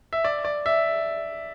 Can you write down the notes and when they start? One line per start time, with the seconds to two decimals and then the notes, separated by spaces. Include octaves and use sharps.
0.13 E5
0.25 D5
0.45 D5
0.66 E5